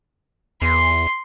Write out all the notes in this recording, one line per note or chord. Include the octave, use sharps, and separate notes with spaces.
E2 C6